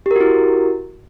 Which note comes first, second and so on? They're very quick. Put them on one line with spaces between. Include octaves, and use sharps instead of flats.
G4 A#4 F#4 E4